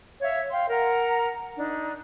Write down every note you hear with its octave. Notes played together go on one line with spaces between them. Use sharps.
C#5 E5 F5
F5 G5 C6
A#4 F#5 A#5
D4 D#4